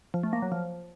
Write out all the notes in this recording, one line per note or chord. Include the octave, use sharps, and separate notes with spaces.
F3
A3
A#3
F#3
F3